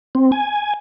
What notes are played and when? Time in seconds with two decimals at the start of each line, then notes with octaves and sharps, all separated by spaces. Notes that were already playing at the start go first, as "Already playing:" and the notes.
0.15 C4
0.32 G#5